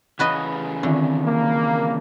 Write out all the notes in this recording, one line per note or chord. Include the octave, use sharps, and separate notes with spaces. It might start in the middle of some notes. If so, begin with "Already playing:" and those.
C#3 E3 F#4 B4 D#5
D3 D#3 C4
A#3